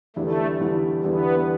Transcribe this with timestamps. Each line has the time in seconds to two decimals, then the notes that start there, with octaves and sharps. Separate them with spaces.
0.16 E2 D3 G3 A3 E4
0.61 E2 D3 G3 E4
1.04 E2 D3 G3 B3 E4